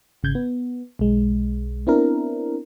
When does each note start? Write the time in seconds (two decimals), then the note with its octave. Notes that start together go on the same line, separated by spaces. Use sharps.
0.23 G#1 C#3 G6 G#6
0.35 B3
0.99 B1 G#3
1.87 B3 C4 D4 E4 A#4